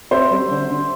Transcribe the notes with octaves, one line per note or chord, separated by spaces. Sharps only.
C4 C5 E5
G3
D3
D3